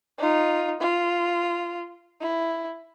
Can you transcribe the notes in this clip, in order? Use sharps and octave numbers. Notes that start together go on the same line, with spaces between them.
D#4 F4
F4
E4